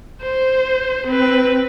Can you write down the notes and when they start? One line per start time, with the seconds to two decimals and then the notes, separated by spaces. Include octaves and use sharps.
0.22 C5
1.07 C4 B4